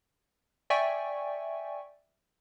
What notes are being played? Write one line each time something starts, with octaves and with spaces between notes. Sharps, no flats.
D5 E5 G5 G#5 C#6